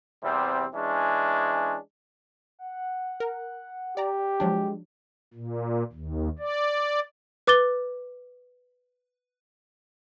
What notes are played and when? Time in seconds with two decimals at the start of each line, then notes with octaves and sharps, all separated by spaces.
0.23 E2 C3 G3 C4
0.75 E3 G#3 C#4 D4
2.59 F#5
3.20 A#4
3.97 G4 D5 A#5
4.40 F3 F#3 G#3 D4
5.34 A#2
5.93 D#2
6.39 D5
7.47 B4 D6 A6 G7